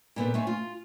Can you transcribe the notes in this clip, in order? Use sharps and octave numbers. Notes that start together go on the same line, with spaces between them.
A#2 B3 C4 A4
A3 C4 C#5 G#5
F4